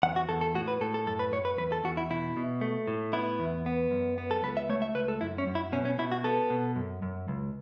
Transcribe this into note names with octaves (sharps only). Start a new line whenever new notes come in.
E2 F#5
F#4
E2 A4
A4
A2 F#4
B4
A2 A4
A4
F#2 A4
B4
F#2 C#5
B4
E2 B4
A4
E2 F#4
E4
B2 E4
B2
A3
A2
B3 E4
E2
B3
F#2
B3
A4
C#2 B4
E5
A3 C#5
E5
C#2 B4
A4
F#2 E4
C#4
F#2
E4
B2 C#4
C#4
B2 E4
F#4
B3 A4
B2
F#2
F#2
C#2